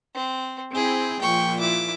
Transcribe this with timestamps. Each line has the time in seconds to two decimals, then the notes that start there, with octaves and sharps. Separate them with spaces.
0.15 C4
0.75 C4 E4 G#4 G5
1.22 A#2 F3 G5 C#6
1.60 E4 D6